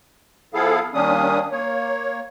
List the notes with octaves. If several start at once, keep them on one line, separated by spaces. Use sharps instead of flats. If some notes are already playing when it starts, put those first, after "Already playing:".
F3 B3 E4 G#4 A4 F5
D#3 G3 A#3 C#4 D4 D#6
A#3 C#5